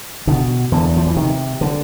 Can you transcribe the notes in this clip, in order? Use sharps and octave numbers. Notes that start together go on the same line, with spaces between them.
B2 D3
E2 D3
F3
E3
C3 D#3
D3